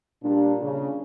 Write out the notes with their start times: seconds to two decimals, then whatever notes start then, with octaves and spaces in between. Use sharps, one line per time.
0.24 A#2 G3 D4
0.62 C#3